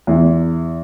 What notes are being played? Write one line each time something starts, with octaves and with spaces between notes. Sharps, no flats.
E2